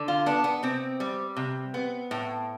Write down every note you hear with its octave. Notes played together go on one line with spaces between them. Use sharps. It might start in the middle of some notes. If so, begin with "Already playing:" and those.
Already playing: D3
F4
B3 D4
B3
C3 C4
G3
C3
B3
A2